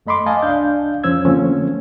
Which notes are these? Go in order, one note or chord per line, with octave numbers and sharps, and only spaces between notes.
F#2 A3 D#5 B5 C6 D6
D#5 F5 G#5 A5
C2 D4 F5 G6
F2 F3 C#4 C5 E6 G#6
D3 F3 A3 A#3 C4 C#4